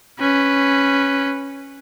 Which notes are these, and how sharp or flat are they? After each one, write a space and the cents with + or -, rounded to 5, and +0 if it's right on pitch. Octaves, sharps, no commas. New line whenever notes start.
C#4 -5 B4 +0